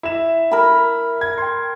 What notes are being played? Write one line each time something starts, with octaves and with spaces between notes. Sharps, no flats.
E4 E7
A#4 B5
G#6
G5 C6